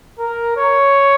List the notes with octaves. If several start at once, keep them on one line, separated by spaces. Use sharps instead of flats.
A#4
C#5